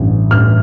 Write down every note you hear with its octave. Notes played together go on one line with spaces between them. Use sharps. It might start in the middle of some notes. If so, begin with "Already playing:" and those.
Already playing: A1 G2 E3
A1 G2 E3 F6